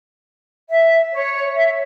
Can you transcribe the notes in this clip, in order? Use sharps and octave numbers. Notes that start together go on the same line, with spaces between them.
E5
C#5
E5